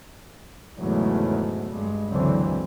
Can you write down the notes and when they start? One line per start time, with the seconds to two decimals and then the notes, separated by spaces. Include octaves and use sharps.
0.78 G#1 E2 G#2 C#3 F#3 A3
1.70 G2 G#3
2.09 C#2 D3 E3 F#3 C4